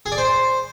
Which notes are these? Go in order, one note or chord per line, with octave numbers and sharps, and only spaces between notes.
G#4
D5
C5